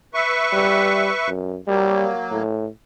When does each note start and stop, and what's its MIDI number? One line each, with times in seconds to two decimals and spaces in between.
0.14 1.30 71
0.14 1.30 76
0.14 1.30 85
0.53 1.10 55
1.28 1.58 42
1.67 2.43 54
1.67 2.08 55
1.67 2.43 58
2.31 2.67 45